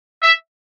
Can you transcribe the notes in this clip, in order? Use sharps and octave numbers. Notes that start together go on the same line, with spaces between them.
E5